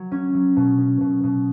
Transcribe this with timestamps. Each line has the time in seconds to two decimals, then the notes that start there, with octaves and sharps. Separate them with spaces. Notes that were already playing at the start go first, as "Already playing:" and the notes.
Already playing: F#3
0.12 C#4
0.34 F#3
0.56 B2
0.78 C#4
1.01 B2
1.24 B2